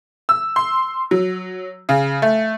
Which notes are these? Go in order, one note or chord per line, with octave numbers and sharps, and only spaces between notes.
E6
C6
F#3
C#3
A3